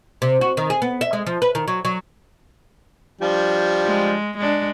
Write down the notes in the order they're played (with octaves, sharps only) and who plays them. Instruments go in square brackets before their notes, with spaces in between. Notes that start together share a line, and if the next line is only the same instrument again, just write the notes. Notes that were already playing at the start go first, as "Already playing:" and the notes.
[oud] C3
F#4
D#3
G#4
B3
E5
G#3
F3
B4
D#3
F#3
F#3
[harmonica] F3 G3 D4
[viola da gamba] G#3
G#3 D4